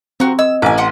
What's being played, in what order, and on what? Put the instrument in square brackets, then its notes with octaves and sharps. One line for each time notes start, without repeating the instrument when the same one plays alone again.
[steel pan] C4 [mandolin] F#4 A#4
[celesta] D#5 [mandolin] E6
[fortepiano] A1 [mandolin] G#5 D6
[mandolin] F#5 C6 D6